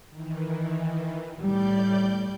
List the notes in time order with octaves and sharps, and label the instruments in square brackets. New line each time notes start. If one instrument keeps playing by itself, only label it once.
[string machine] D#3 E3
[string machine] A2 D5 G6 [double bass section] G3